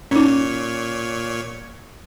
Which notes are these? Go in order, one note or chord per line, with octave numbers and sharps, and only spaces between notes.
A#2 C#4 D#4 C#5